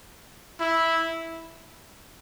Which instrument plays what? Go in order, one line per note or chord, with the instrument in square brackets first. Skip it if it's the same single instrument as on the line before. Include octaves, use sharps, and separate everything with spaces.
[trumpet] E4